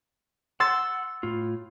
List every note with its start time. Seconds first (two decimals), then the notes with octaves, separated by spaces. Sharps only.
0.60 F#5 C6 E6 A6
1.23 A2 F4